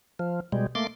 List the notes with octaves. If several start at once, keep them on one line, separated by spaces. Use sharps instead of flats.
F3
B2 G3 G#3
A3 A#3 C6 D6